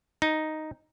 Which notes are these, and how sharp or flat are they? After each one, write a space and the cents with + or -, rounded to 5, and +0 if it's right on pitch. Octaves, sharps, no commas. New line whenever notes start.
D#4 +0